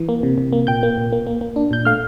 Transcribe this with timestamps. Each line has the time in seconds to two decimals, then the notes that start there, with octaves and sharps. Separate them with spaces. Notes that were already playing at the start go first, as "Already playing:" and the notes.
Already playing: E3
0.09 A#3
0.23 C3
0.38 C3
0.53 A#3
0.67 A#2 G5 G6
0.83 A#3
0.98 A#2
1.13 A#3
1.27 A#3
1.41 A#3
1.56 D4
1.71 A#2 G6
1.85 A3 F5 F6